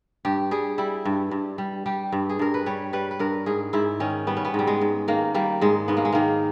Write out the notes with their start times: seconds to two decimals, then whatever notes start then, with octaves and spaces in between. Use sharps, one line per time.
0.25 G2 G4
0.51 G3 G#4
0.78 G3 E4
1.05 G2
1.31 G2
1.58 G3
1.86 G3 G4
2.12 G2
2.29 G#4
2.39 G2 A#4
2.54 B4
2.66 G3 C#5
2.93 G3 B4
3.11 B4
3.19 G2 A#4
3.46 G#2 G#4
3.73 G#2 E4
4.00 D#3 C#4
4.27 G3 B3
4.37 C#4
4.45 B3
4.54 G#2 G3
4.67 G#3
4.81 G#2
5.08 D#3 A#3
5.35 G3 A#3
5.61 G#2 G#3
5.88 G#2 B3
5.97 A#3
6.05 G#3
6.12 D#3 A#3